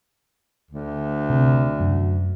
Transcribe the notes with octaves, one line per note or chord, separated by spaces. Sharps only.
D2
C3
F#2